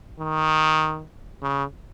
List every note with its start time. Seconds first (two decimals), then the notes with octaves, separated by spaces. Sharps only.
0.20 D#3
1.42 C#3